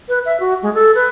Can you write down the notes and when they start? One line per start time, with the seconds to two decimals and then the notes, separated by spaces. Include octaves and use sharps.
0.09 B4
0.26 E5
0.40 F#4
0.63 G#3
0.74 A4
0.95 B4